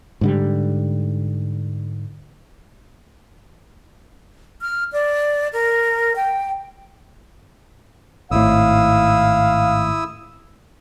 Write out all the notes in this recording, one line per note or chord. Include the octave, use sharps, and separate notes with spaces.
G#2 D3 G3
F6
D5
A#4
G5
G#1 A2 E4 F5 D#6 E6